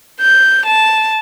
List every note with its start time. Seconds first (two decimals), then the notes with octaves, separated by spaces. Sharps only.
0.21 G6
0.66 A5